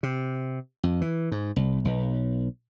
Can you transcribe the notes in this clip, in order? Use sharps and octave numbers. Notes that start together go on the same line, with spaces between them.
C3
F2
E3
G#2
C2
B1